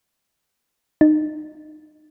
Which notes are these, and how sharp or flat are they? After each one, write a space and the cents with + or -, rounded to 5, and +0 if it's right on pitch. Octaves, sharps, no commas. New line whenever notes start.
D#4 -30